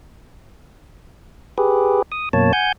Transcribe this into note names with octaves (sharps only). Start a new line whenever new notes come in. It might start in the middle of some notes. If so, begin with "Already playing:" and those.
G4 G#4 B4
D#6
F#2 B2 A#3 C#5 A5
F#5 G#5 G6